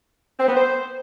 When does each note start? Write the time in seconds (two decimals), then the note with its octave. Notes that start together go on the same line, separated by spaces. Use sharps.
0.39 C4
0.48 B3
0.56 C5